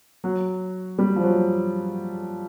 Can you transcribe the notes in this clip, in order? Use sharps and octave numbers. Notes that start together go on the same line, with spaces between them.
F#3
G3
F3
F#3